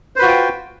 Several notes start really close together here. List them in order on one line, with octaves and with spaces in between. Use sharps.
C5 B4 F#4 F4 G5